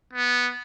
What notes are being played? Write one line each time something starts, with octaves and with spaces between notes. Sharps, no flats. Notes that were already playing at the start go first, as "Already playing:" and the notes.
B3